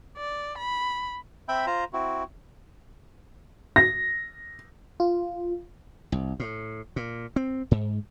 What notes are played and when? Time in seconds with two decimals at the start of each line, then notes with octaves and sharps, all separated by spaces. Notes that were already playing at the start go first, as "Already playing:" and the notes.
0.18 D5
0.58 B5
1.48 C4 E5 G5 B5
1.66 F4 C5 A#5
1.93 C4 E4 F#4
3.76 A#6
5.00 F4
6.12 C2
6.40 A2
6.96 A#2
7.36 C4
7.71 G#2